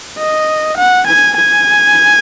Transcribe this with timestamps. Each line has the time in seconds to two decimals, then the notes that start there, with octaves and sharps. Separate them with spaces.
0.18 D#5
0.77 F#5
1.07 G#5
1.36 G#5